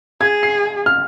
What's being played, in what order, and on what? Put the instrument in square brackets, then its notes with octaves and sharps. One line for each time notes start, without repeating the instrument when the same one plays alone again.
[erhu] G#4 [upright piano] G#6
[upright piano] C7
F6